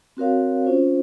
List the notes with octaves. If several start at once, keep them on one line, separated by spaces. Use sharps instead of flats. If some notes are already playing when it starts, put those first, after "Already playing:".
C4 F#4 A#4 C#5 F5
C#4 F4 C5